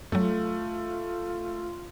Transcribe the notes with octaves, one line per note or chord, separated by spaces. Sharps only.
F#2 F#3 A3 F4